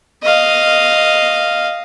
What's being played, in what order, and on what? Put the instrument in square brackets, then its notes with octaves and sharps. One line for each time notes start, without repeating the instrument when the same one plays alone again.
[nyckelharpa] D#5 F5